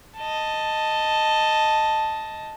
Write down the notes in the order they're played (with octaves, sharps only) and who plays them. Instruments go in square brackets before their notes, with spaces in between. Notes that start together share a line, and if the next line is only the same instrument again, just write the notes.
[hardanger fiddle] D#5 A5